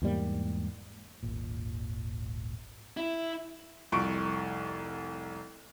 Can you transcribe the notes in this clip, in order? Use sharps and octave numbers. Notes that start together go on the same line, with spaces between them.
E2 G#2 G3 A#3
D#1 G#1 A#2
E4
F1 C2 C#6 D7